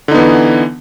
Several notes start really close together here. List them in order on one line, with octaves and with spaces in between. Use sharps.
D3 D#4 B3 E3